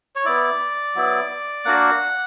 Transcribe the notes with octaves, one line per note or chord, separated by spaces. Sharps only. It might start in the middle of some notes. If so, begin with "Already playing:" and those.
C#5
B3 E4 D5
F#3 B3 E4
A#3 D4 F#4 F#5